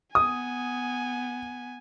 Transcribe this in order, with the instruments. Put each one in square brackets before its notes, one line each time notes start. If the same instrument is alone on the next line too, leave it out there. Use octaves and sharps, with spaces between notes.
[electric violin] B3 G#5 [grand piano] D#6